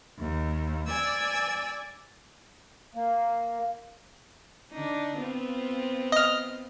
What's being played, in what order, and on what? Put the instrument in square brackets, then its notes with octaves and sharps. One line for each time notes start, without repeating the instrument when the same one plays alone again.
[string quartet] D#2
D5 G#5 E6
[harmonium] A#3
[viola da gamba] D3 D4 D#4
B3 C4 F4
[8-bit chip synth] D#5 F6